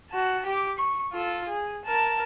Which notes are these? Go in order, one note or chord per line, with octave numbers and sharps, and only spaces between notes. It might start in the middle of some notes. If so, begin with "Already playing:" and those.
F#4 A5
G4 D6
C#6
F4 A4
G#4
A#4 A5